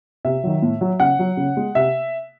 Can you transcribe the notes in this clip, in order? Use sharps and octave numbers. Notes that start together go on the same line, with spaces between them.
C3 E5
D#3 F#3
A2
F#3
C#3 F#5
F#3
C#3
G#3
C3 E5